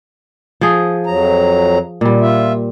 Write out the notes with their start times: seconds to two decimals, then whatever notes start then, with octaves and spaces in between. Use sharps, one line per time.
0.61 F3 G#4
1.06 F2 F#3 A#5
2.01 A#2 G3
2.21 F4 E5